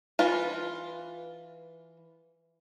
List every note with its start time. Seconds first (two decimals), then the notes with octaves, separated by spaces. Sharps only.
0.19 E3 F4 B4